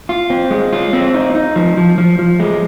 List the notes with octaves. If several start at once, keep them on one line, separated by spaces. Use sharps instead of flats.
F4
C4
G#3
F4
C4
D#4
D#4
F3
F3
F3
F3
G#3